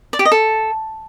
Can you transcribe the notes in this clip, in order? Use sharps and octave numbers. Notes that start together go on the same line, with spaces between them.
D5
G4
D#5
A4